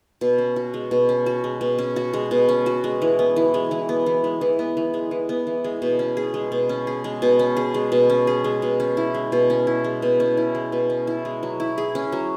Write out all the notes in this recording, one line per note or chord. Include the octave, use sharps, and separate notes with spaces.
B2
C#4
F#4
G#3
B2
C#4
F#4
G#3
B2
C#4
F#4
G#3
B2
C#4
F#4
G#3
E3
B3
E3
G#3
E3
B3
E3
G#3
E3
B3
E3
G#3
E3
B3
E3
G#3
B2
C#4
G#4
G#3
B2
C#4
G#4
G#3
B2
C#4
G#4
G#3
B2
C#4
G#4
G#3
B2
C#4
E4
G#3
B2
C#4
E4
G#3
B2
C#4
E4
G#3
B2
C#4
E4
G#3
F#3
E4
G#4
C#4
F#3